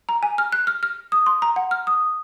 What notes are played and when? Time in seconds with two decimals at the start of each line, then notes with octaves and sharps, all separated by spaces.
0.09 A#5
0.23 G#5
0.38 F6
0.52 F#6
0.67 F6
0.83 F6
1.12 D#6
1.26 C6
1.42 A#5
1.56 F#5
1.71 F6
1.87 D#6